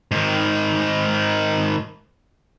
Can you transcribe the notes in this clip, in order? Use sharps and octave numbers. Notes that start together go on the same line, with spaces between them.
G#2 D#3